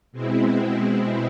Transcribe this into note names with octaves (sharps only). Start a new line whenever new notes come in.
B2 G#3 C4 E4